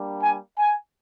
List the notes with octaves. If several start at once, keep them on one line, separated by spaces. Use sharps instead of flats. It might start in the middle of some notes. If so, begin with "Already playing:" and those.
Already playing: G3 A#3 D4
G#5
G#5